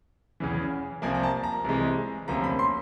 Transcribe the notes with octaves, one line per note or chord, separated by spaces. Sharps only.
E2 C#3 E3
C2 C3 F3 A#3 G#5
A#5
A5
A#5
C2 C3 E3 G#3
D2 C3 F3 A#3 C#4 A#5
B5
C6